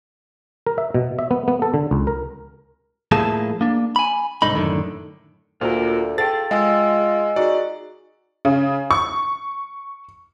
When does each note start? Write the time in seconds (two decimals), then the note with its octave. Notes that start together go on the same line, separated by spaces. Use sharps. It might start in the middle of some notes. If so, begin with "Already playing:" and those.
0.67 A#4
0.78 E5
0.94 B2
1.19 E5
1.31 B3
1.48 B3
1.62 A4
1.74 D3
1.91 C#2
2.07 A#4
3.12 A2 F3 A3 A#3 G#4 A5
3.61 A#3 D4
3.96 G#5 B5
4.42 C2 G#2 D3 D#4 B5
4.55 F#2 A2 D3 D#3
5.61 D2 A#2 F4 F#4 A#4
6.18 G#4 A4 F5 G5 A6
6.51 G#3 F4 D#5 G#5 E6
7.36 D#4 F#4 G#4 D5
8.45 C#3
8.91 C#6